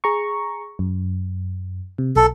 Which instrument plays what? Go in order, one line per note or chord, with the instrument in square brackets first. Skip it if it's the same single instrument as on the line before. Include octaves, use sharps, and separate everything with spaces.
[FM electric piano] G#4 A#5 C#6
F#2
C3
[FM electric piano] B1 [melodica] A4